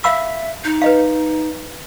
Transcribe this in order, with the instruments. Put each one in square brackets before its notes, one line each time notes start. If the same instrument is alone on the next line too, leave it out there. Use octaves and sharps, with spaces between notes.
[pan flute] E5 [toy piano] F5 B5 E6
[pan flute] D#4
[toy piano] B4 D#5 F5